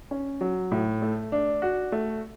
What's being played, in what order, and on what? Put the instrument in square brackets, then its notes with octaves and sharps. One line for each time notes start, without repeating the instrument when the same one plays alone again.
[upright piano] C#4
F#3
A2
A3
D4
F#4
A3